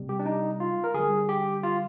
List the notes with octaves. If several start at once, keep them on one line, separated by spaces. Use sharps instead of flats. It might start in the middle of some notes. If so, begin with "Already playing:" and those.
Already playing: C3 G3
G4
D4
D#4
F4
A#4
D3 G3 G#4
G4
F4